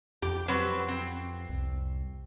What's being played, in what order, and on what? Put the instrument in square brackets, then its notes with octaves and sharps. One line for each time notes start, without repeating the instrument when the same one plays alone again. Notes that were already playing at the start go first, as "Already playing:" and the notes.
[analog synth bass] F2 [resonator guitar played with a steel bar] G4
[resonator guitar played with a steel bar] F#3 C4 B4
C4
[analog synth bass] C2